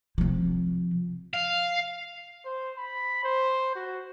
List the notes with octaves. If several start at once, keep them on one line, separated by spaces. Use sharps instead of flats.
C3 F3
F5
C5
B5
C5
F#4